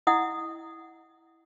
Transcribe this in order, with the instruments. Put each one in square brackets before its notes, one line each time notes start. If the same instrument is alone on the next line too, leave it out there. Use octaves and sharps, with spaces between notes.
[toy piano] E4 D#5 F#5 D#6